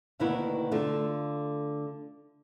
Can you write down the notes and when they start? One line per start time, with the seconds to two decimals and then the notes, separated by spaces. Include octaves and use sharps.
0.19 D2 B2 D#3 A#3 B3 E4
0.71 D3 A3 F4